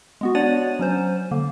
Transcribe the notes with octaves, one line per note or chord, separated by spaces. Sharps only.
G#3 B3 F#4
D4 C#5 D5 F#5 A6 D#7
F#3 C#4 C5
D3 A#3